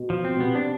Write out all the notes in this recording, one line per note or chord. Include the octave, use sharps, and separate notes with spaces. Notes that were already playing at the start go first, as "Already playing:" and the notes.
Already playing: B2
F3
C4
B2
C3 B3
D4